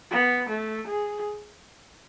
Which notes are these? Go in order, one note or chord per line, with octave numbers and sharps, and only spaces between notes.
B3
A3
G#4